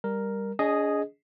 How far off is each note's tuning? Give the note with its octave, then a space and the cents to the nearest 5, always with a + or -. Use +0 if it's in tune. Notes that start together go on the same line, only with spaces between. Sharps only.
G3 +10 A#4 +0
D4 -45 G#4 +0 D#5 -5